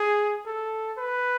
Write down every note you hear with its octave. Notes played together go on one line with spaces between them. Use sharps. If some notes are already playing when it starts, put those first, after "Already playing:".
Already playing: G#4
A4
B4